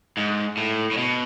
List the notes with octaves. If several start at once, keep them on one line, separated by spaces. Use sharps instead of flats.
G#2
A2
A2
B2